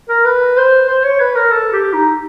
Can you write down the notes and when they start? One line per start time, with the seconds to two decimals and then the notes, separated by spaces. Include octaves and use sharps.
0.09 A#4
0.25 B4
0.57 C5
0.88 C5
1.04 C#5
1.20 B4
1.35 A#4
1.52 A4
1.72 G4
1.93 D#4